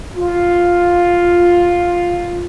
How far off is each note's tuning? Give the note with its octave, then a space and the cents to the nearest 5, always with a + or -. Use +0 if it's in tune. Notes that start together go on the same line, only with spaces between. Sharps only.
F4 +5